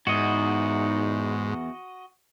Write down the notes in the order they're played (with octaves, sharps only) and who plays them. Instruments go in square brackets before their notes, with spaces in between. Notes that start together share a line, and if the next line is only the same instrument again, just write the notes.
[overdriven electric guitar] E2 [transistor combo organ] G#2 [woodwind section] D#4 [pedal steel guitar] F#4 D#5